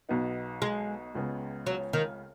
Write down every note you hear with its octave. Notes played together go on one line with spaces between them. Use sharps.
B1 B2 B3 D#4
G#3
C#2 C#3 G#3 B3
F#3
D#3